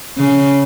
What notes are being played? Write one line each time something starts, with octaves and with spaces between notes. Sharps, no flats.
C#3